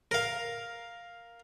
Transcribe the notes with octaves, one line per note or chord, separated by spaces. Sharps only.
A#4 F5